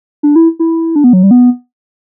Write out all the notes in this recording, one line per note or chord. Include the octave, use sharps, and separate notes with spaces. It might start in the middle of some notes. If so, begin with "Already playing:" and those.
D4
E4
E4
D4
B3
F#3
G3
B3